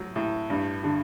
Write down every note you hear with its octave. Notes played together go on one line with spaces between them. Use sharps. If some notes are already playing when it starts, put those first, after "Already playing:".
Already playing: A2 F#3
A2
G2
D3